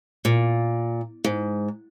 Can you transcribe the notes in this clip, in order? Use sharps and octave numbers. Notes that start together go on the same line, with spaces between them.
A#2
G#2